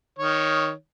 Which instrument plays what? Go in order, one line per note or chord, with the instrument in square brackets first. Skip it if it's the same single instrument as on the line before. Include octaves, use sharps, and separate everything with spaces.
[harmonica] D#3 C#5